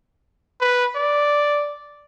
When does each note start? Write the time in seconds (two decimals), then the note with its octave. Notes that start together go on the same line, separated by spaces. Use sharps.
0.61 B4
0.95 D5